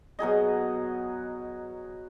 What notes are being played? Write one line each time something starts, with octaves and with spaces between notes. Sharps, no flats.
B2 F#3 G#4 D#5